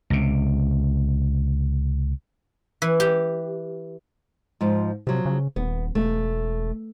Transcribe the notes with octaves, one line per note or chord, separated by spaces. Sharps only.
C#2 C3
E3
G4
G#2 F3
C3 F3 F#3
C#3
D#1 B3
E1 A3